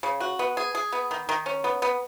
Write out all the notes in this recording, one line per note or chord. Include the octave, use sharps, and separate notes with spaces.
C#3
F#4
B3
G#4
G#4
B3
D#3
D#3
C#4
B3
B3